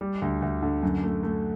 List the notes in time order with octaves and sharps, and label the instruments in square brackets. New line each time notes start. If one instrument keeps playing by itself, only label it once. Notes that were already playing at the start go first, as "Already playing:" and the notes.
[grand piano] G3
D2
D2
D3
F#2
A3
A3